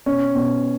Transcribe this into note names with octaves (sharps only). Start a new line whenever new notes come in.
B2 C#4
B2